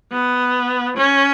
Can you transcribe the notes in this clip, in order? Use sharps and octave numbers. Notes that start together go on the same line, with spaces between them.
B3
C#4